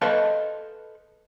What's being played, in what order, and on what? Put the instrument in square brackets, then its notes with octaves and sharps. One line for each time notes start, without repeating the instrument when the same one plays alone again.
[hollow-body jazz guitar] A4 B4 C5 D#5 F5 A5